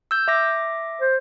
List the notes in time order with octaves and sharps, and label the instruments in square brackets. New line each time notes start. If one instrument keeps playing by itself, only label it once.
[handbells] E6 G6
E5 D6 A#6
[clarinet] C5